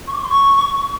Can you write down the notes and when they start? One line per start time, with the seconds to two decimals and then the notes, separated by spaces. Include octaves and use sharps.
0.07 C#6
0.13 D6
0.18 C#6
0.24 C6
0.29 C#6